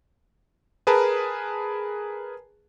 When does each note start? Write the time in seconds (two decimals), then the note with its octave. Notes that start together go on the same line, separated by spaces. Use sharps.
0.87 G#4 A#4 B4 A5